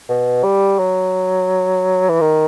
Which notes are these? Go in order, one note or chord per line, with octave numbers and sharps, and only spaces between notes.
B2
G3
F#3
E3
D#3